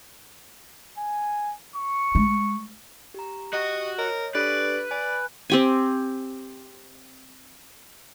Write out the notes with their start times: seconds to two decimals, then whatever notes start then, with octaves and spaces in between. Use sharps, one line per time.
0.97 G#5
1.76 C#6
2.15 G#3
3.14 G4 A#5
3.53 F#4 G4 D#5 F#5 C#6
3.98 A#4 C#5 D#5
4.35 D4 G4 A4 B4 D5
4.91 D5 G#5
5.50 C4 G4 G#5